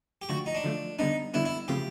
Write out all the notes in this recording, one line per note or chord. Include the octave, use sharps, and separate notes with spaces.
G4
D3 F3 A3 F#4
D#4
D4
D3 F3 A3
D3 G3 B3 D4 D#4
D3 G3 B3 D4 E4
E4
C#3 F3 A3 C4 G4